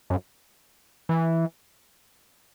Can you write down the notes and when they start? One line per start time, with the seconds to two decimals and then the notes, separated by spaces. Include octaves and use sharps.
0.10 F#2
1.09 E3